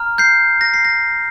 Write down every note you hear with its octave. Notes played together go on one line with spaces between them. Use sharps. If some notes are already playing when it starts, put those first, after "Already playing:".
Already playing: A#5 F6
G6 C7
A#6
C7
A#6